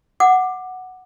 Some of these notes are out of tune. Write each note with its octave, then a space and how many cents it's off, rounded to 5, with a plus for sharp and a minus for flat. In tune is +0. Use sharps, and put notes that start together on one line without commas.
F#5 +0 D6 +15